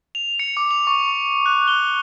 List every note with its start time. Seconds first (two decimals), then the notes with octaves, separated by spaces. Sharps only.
0.15 F7
0.40 C#7
0.57 D6
0.71 F7
0.87 C#6
1.46 F#6
1.68 G7